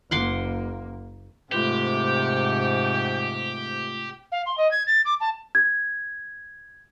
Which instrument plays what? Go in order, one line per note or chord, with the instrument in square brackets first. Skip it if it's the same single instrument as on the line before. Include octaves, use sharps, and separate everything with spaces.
[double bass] F#1 A#3 [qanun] F#5 C6 D6
[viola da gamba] G#2 C3 [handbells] A3 F4 B4 [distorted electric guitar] G4 [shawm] G5
[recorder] F5
C6
D#5
G#6
A6
D6
A5
[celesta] G#6